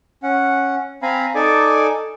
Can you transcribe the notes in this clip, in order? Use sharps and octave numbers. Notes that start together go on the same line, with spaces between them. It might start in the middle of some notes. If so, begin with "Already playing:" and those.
C#4 F#5
C4 F5 G#5 A#5 B5
D#4 A4 D5 G#5 D6